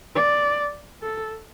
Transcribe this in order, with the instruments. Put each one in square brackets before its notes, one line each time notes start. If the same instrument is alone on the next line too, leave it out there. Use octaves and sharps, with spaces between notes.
[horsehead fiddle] D5
A4